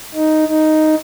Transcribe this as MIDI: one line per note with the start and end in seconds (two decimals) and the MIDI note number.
0.14 0.46 63
0.46 0.95 63